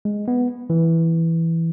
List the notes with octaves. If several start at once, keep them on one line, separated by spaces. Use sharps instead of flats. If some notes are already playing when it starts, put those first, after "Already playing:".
G#3
B3
E3